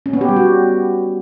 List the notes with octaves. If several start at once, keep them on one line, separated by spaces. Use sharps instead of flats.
C#4
B3
G4
G3
F#4